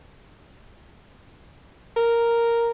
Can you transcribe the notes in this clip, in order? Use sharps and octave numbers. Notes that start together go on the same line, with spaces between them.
A#4